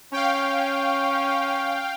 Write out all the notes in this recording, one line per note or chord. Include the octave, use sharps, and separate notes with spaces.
C#4 F5 G5